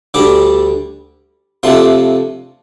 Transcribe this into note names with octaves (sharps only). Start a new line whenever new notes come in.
D2 D3 G3 D4 D6
F2 C3 F3 A3 D4 C6